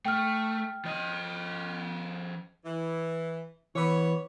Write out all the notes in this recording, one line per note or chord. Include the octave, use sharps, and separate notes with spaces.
A3 G5 F6
F3 D#5
E3
E3 B3 B4 C#5